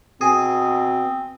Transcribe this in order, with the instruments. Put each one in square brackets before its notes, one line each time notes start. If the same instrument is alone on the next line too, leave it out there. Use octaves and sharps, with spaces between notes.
[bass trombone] B2 [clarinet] C4 [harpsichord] G#4